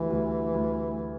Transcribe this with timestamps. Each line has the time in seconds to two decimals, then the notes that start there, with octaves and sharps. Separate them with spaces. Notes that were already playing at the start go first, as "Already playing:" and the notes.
Already playing: D2 E3 G3
0.10 D2
0.54 D2